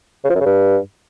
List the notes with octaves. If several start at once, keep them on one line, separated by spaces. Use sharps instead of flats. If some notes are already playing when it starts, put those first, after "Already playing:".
C#3
F3
F#2
C#3
G2